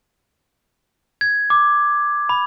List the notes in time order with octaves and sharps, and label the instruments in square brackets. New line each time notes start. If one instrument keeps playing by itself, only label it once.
[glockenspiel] G#6
D6
B5